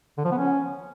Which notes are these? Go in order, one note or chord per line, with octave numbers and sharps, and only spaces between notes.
D3
F3
B3
C#4